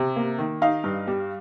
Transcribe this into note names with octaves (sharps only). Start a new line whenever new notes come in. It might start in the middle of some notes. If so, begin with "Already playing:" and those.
Already playing: C3
A#3
D#3
D#4 F5
G2
G3